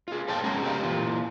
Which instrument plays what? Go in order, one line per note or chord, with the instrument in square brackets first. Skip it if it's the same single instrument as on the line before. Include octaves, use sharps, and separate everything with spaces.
[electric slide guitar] F4 G#4
A4 C5 F5 G5 A5
G#3 C#4 F4 G#4 F#5 A#5
G4 A4 B4 C5 D#5 F5
A#2 E3 F4